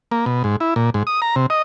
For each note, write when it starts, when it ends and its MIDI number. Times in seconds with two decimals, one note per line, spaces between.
0.11 0.25 58
0.26 0.43 47
0.44 0.56 44
0.60 0.74 64
0.76 0.90 46
0.94 1.03 44
1.07 1.21 87
1.22 1.35 82
1.36 1.46 48
1.50 1.62 75